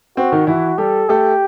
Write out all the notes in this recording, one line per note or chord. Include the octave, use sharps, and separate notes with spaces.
C4 F#4
D#3 D#4
E3 E4 F#4
G3 G4 A4
A3 G4 A4